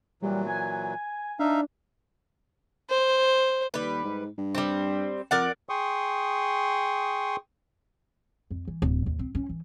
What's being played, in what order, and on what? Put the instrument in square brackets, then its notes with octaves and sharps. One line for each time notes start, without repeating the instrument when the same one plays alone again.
[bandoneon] A#2 E3 F#3 [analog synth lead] G3
[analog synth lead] G#5
[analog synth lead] D4 [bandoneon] D#4 E5 F5
[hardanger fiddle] C5
[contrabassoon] D#2 [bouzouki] G3 B4
[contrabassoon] G#2
G2
[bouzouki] G3 C4
[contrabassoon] F2 [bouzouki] A#4 D5 F#5
[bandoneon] G#4 G5 C6 C#6 D#6
[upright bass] F2
E3
D1
D#2
C4
C#4
E3